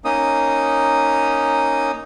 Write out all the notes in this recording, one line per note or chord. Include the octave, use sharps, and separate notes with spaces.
A#3 C#4 D#4 D#6